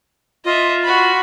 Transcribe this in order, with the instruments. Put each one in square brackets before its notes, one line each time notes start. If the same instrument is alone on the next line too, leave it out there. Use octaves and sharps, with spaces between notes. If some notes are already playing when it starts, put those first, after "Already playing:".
[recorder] F4 [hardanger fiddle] D#5 E5
[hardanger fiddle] F#4 B5